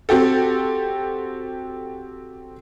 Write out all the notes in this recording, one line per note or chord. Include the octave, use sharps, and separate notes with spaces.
C4 F#4 G4 A4